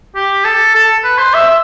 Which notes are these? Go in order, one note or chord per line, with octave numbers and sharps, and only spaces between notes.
G4
A4
A4
B4
C5
E5
E5